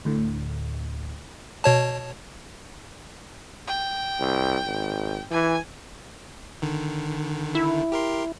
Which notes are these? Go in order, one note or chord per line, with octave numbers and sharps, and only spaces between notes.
D2 A2 D3
B2 C#5 A5
G5
C2
G#1
E3 G#5
D3 D#3
E4
G4 A#4 C6